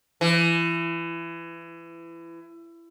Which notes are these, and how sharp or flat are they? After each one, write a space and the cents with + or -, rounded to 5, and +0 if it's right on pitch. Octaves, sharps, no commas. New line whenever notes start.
E3 +25